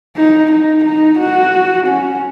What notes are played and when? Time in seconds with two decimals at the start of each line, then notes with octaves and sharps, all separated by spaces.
0.17 D#4
0.51 D#4
0.84 D#4
1.20 F#4
1.87 C#4